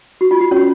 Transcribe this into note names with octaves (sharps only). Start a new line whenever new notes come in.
F#4
F4
F#4
C#4 C#5